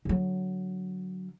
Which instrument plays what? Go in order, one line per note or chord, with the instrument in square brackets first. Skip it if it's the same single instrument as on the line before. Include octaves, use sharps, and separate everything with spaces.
[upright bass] D3 F#3